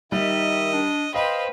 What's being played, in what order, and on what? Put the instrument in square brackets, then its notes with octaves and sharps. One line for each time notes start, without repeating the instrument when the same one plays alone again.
[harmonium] D#3 [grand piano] G3 [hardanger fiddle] D#5 [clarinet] E5
[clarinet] D4
[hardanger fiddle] B4 [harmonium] C5 G5 [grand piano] D#5 [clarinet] F5